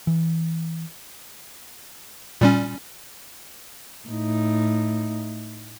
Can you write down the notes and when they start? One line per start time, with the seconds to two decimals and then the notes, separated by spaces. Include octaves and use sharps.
0.07 E3
2.41 A#2 G3 C#4
4.09 A2 D#4